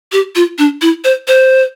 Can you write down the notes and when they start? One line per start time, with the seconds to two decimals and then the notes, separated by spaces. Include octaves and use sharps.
0.12 G4
0.36 F4
0.59 D4
0.82 E4
1.04 C5
1.28 C5